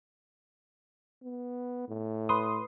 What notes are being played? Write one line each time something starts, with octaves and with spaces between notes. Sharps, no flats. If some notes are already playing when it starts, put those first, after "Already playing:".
B3
A2
B4 C6 D#6